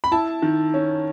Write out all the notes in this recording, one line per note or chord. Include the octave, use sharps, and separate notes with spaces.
B5
E4 A5
D#3
C#4